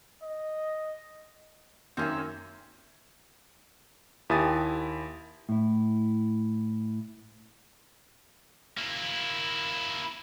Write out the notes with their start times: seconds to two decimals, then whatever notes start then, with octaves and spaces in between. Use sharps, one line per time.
0.23 D#5
1.97 F#2 D#3 A#3 C4 C#4 E5
4.30 D#2 E4 G4 G#5 D#6 A6
5.49 A2 E4
8.77 A#3 E4